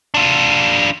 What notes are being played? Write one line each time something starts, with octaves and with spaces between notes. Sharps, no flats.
D4 F4